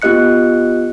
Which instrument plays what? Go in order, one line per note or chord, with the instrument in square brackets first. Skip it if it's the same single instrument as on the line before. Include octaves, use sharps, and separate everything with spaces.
[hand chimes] B3 F4 G4 D#5 F#6 C#7